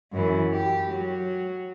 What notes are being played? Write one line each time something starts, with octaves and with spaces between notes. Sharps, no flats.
F#2 E3
G4
F#3